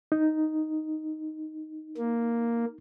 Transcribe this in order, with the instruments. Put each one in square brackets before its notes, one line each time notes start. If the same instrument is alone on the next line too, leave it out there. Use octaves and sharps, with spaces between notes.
[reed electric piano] D#4
[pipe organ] A#3